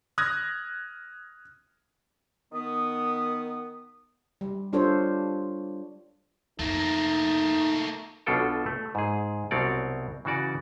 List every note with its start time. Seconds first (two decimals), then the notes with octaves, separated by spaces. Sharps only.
0.18 D#6 F6 F#6 G#6 A#6
2.52 D#3 B3 D#6
4.41 G3
4.73 G3 D4 F4 A4 C5 C#5
6.59 F2 A3 A#3 D#4
8.26 B1 B2 D4 F4 A4 G5
8.66 A3
8.95 G#2 G#4
9.51 C2 B2 F#3 C4 C#5 D5
10.25 C#3 E3 F#4 D5